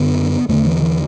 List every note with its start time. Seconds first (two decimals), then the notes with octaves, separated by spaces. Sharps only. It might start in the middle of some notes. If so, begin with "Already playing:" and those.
Already playing: F#2 D3 B3
0.49 E2 D3 A3
0.66 E3
0.82 E3